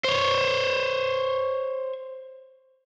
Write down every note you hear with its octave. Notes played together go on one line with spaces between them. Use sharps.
C5 C#5